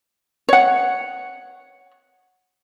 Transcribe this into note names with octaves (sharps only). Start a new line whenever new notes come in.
C#5 F#5